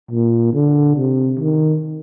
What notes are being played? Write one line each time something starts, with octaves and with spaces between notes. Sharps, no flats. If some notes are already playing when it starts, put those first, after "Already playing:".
A#2
D3
C3
D#3